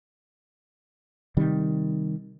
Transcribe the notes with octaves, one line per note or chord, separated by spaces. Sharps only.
C3 D#3 G3